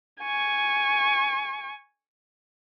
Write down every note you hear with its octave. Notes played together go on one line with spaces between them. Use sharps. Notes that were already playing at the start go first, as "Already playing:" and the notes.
G#5 C#6